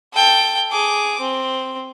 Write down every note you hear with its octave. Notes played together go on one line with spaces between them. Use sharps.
A4 G5
G#4 D6
C4